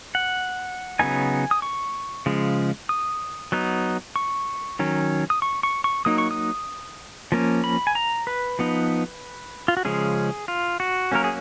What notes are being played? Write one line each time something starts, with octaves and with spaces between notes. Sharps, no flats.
F#5
C#3 F#3 B3 D#4 G#5
D#6
C#6
C#3 F3 G#3
D#6
F#3 B3 D#4
C#6
D#3 F#3 C#4
D#6
C#6
C#6
C#6
F#3 A#3 D#4 D#6
C#6
D#6
F3 A#3 C#4
B5
G#5
A#5
B4
F3 B3 D#4
F4
F#4
C#3 F3 G#3 C#4 G#4
F4
F#4
F#3 A#3 C#4 A#4
G#4